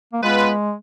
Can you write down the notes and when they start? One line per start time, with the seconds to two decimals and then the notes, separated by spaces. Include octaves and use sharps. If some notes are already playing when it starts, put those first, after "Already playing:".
0.13 A#3
0.23 G#3 B3 F4 B4